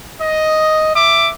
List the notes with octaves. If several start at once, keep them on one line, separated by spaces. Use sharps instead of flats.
D#5
E5 D6